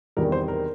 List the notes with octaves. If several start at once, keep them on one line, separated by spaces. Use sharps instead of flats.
E2 C3 D#3 G3 A#4
C5
A#4